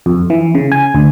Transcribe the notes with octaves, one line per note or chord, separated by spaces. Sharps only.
F2
E3
C#3
G#5
D2